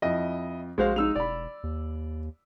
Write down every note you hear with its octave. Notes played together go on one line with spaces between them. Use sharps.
F2 E4 D#5
A#1 G#3 F#4 C5 F5
G#3 D#4 E6 F7
E1 D5 B5
D#2